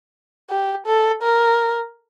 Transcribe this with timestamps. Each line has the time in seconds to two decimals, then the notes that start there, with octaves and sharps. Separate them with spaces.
0.50 G4
0.87 A4
1.23 A#4